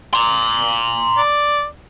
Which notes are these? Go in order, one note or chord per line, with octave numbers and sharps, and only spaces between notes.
A#5 C6
D5